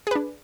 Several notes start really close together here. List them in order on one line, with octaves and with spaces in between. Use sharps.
G#4 B4 D4